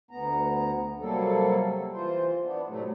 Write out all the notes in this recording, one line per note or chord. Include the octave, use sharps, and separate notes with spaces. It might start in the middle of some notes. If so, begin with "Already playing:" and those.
D2 B3 A#5
C3 F#3 G3 A#3 A4
E3 F4 C5
B3 D4
A2 C3 F#3 A3